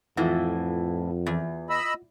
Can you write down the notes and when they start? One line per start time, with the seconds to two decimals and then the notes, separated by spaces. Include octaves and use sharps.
0.17 F2 A2 E3 F4 F#5
1.26 E2
1.70 D#5 B5 E6